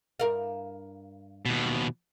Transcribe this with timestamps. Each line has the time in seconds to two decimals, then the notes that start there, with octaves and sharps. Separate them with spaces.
0.20 G2 A#4 F5
1.45 D#2 B2